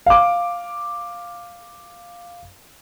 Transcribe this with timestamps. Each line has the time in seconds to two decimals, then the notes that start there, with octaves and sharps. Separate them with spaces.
0.06 F5 D6